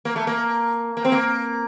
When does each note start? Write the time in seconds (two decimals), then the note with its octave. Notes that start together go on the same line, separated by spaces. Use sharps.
0.05 A#3
0.16 A3
0.27 A#3
0.97 A#3
1.05 C4
1.12 A#3